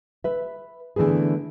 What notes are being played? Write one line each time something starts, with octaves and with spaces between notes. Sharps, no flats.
B4 E5
D3 E3 A3 B3 G#4